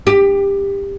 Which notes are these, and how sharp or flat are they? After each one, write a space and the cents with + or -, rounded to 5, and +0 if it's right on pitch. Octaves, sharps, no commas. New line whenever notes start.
G4 +20